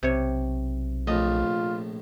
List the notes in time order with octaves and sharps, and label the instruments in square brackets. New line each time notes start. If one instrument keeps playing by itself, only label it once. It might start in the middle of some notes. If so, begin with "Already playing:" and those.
[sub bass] B1 [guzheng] C3 C#5
[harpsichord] A#1 A2 [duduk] F4 [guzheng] D#5